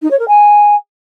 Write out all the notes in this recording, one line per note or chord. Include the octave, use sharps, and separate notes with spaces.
D#4
C#5
A#4
G#5